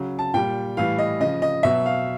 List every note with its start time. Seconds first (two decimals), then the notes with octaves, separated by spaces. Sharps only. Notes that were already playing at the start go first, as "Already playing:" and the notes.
Already playing: C#3 F#3
0.19 A5
0.34 A#2 G3 G5
0.77 A2 E3 G3 F5
0.98 D#5
1.20 C#3 F3 D#5
1.42 D#5
1.63 B2 F#3 E5
1.86 F5